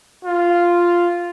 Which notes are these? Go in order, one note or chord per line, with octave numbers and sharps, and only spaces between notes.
F4